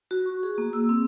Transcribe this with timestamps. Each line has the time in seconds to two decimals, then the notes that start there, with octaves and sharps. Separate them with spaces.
0.11 F#4
0.26 C#6
0.43 G#4
0.58 A#3
0.73 E6
0.89 C4